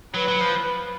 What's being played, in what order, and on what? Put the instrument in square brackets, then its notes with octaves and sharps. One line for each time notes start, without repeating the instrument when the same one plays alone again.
[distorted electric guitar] F#3 [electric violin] B4
[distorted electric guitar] F#3
F3